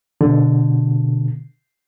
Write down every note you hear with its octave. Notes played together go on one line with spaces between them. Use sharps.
B2 D3